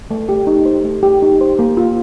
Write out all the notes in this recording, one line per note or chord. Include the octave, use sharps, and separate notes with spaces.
A3
G4
D#4
C5
A3
G4
D#4
C5
A#3
F4